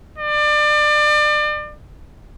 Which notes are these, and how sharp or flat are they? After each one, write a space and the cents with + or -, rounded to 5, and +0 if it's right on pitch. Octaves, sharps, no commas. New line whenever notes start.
D5 +30